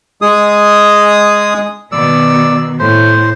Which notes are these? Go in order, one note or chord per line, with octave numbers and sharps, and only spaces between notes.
G#3 G#4 D#6
B2 D#3 D5 E6
A2 C5